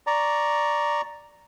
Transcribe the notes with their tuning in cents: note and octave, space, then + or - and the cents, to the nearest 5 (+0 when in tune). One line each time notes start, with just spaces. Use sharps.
D5 +0 A#5 +0 C#6 +0